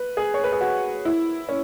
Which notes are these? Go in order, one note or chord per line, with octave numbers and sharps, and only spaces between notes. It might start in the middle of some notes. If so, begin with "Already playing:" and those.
Already playing: B4
G#4
C#5
B4
G#4
F#4
E4
C#4